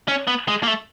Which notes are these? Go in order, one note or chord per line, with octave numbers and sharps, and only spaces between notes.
C#4
B3
G#3
A#3
A3